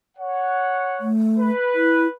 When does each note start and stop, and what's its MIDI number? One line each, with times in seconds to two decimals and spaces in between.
0.17 1.09 73
0.17 1.09 78
1.00 1.50 57
1.39 2.14 71
1.75 2.07 64